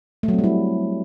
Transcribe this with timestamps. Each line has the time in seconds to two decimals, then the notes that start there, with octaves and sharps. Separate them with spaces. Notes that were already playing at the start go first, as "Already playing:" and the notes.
0.23 A3
0.28 F#3
0.33 C4
0.39 G3
0.44 E4